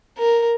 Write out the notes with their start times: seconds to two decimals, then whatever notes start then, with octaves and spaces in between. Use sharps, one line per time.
0.18 A#4